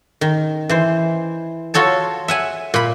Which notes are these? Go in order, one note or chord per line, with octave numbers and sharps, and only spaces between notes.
D#3
E3 C5
F4 F#4 A4 C#5 A5
E5 F#5 G#5
A#2 B5